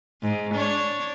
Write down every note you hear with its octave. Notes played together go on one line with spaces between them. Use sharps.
G#2
D4 C#5